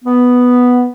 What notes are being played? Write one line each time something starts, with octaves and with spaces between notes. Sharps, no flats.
B3